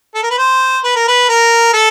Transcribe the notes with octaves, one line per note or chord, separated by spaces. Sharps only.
A4
A#4
B4
C5
B4
A#4
B4
A#4
A4